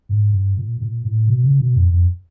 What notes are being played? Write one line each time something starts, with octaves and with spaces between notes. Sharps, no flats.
G#2
G2
A#2
A#2
A2
B2
C#3
B2
F2
F2